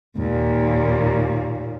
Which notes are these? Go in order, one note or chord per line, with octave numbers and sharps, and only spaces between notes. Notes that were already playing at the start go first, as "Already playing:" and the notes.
D#2 A#2